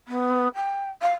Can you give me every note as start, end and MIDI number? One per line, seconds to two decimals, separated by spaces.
0.08 0.48 59
0.55 0.89 79
1.01 1.13 77